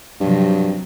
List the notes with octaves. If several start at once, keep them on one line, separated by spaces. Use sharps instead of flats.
G2 C3 F3 F#3